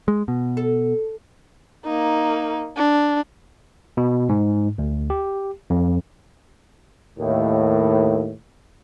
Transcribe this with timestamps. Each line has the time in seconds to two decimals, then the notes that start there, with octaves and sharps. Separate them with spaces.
0.08 G#3
0.28 B2
0.57 A4
1.85 A#3 D#4
2.77 D4
3.97 B2
4.29 G#2
4.78 D2
5.10 G4
5.70 F2
7.19 D#2 A2